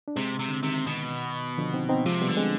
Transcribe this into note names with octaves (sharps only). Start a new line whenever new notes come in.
D4
C3 G#3 C4
C3
D3
C3 D#3
B2
D3 F3
C4 D#4
C4 D#4
C3 F3 G#3
G3 B3
D3
G#3 C4